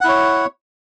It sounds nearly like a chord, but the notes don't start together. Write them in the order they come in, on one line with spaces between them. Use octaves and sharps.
F#5 E4 C#5